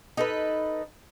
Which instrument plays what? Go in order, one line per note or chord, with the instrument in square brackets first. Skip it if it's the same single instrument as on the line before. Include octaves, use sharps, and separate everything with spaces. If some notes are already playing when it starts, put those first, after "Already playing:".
[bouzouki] D#4 A4 B4